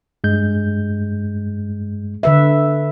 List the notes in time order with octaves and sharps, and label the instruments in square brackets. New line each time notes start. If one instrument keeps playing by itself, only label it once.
[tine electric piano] G2 G#3 G6
[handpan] D3 B4 E5